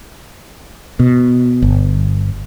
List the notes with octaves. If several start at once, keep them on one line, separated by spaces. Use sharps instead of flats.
B2
G1